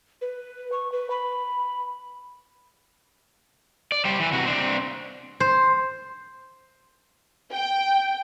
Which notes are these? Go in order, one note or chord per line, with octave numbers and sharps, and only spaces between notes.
B4
C#6
B4
B5
D5
G3 G4 C5
E3
C3 E3 F#4
C4 D4
C5
G5